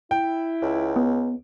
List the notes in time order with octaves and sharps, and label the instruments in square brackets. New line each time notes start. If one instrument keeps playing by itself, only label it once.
[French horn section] E4 [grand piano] G5
[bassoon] C#2
[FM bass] B3